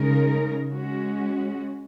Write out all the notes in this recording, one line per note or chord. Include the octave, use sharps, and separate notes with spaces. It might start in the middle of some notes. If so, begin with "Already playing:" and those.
Already playing: C#3 G#3 D#4 A#4
G#3 C#4 F#4